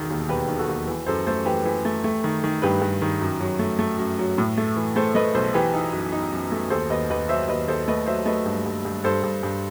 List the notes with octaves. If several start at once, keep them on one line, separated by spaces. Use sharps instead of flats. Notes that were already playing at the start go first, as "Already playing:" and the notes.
Already playing: E1 B1 D#3
D#2
E1 G4 B4
D#3
F#4 A4
D#2
E3
F#2 A4 C5
A3 A4 C5
E3 G4 B4
E3
A3
A3
D#3
D#3
G2 G4 B4
G2
D#3
F#2
F#3
A3
A3
F#2
F#3
A2
A3
E3
A3 A4 C5
A3 B4 D#5
B1 A4 C5
E3 G4 B4
D#4
F#2
D#4
F#2
A3
D#2 A4 C5
D#2 B4 D#5
D#2 B4 D#5
F#3 C5 E5
D#2 B4 D#5
D#2 A4 C5
A3 B4 D#5
F#3 C5 E5
A3 B4 D#5
G2
G2
G2
G2 A4 C5
G2
G2